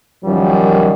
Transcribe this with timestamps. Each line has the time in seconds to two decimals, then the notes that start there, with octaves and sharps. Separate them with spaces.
0.24 F#2 D#3 F3 G3